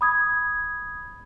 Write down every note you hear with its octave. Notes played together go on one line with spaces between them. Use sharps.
B5 D#6 G#6